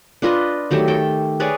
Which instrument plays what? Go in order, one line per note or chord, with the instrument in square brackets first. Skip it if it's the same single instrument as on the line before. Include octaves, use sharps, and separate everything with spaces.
[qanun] D4 F4 B4 D#5
D#3 F#3 A3 G4
A4 G5
G#4 B4 C#5 D5